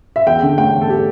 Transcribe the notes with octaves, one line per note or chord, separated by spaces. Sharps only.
E5
E2 G5
D3
A3 G5
E2
A4
G4